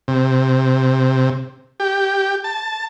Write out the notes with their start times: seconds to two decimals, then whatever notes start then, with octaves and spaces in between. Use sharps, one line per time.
0.08 C3
1.80 G4
2.44 A5